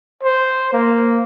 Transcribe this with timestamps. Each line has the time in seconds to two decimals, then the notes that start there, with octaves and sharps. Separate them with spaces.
0.23 C5
0.73 A#3